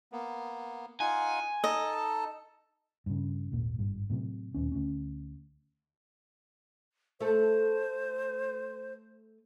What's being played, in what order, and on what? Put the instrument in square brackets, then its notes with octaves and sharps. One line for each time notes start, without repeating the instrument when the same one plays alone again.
[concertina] A#3 B3
[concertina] D#4 F4 F#5 [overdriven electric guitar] G#5
[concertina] D#4 A4 A5 [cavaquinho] D#5
[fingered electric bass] G2 C#3
D#1 G#1 A#2
G#1 G2
A2 C3 F#3
D#1 G#1 D#2 C#4
D2 C#4
[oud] A3 A4 [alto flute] C5